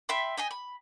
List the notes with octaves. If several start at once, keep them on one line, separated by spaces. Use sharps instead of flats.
E5 G5 B5 C6
D#5 G5 G#5
B5